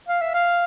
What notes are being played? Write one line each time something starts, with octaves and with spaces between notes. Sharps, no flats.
F5
E5
F5